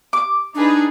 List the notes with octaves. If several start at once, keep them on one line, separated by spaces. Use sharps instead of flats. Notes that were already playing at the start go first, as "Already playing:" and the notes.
D6
D4 D#4 G#4 B4